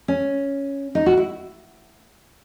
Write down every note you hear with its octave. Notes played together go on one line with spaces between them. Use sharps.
C#4
D#4
F#4
E4